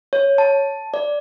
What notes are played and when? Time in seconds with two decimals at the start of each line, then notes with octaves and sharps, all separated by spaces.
0.13 C#5
0.38 A5
0.94 D5